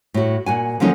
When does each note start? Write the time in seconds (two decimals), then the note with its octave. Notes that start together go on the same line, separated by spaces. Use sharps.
0.14 A2 F#4
0.46 A#2 F#4 G#5
0.80 D3 F3 F#3 A#3 C#4 D#4